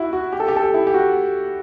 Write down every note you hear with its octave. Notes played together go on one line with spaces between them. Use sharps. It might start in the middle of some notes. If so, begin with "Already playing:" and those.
Already playing: E4 F#4
F#4
G4
A4
G4
A4
G4
E4
G4
F#4